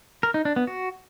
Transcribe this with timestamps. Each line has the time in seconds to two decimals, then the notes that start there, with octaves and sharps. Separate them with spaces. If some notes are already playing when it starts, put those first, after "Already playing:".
0.23 A#4
0.34 D#4
0.45 D4
0.56 B3
0.67 F#4